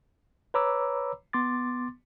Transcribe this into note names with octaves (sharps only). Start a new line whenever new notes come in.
B4 C#5 A#5 B5 D6 E6
B3 C6 D6 A6